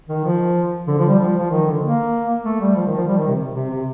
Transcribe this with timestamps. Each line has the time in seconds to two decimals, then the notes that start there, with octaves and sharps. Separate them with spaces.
0.09 D#3
0.24 F3
0.88 D3
0.98 F3
1.08 G3
1.19 F3
1.39 F3
1.51 D#3
1.66 D3
1.82 A#3
2.45 A3
2.60 G3
2.76 F3
2.86 D#3
2.97 F3
3.07 G3
3.18 D#3
3.28 C3
3.55 C3
3.71 C3